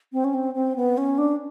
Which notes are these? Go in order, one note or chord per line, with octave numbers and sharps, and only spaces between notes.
C4
C#4
C4
C4
B3
C#4
D4